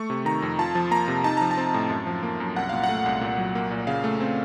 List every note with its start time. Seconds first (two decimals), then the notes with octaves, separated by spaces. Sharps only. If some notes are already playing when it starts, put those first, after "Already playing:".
Already playing: A3 C#6
0.10 C3
0.25 D#3 A#5
0.42 F2
0.59 F4 A5
0.75 F3
0.91 A#3 A#5
1.08 C3
1.24 D#4 A5
1.37 F3 A#5
1.51 A5
1.57 C4
1.74 A2
1.90 F#2
2.07 F3
2.23 A#3
2.40 F#2
2.56 C2 F#5
2.69 A#2 F5
2.84 F#5
2.89 A3
3.06 C2
3.21 A#2
3.38 F#3
3.55 A#3
3.71 A#2
3.87 C#3 F5
4.04 A3
4.20 C4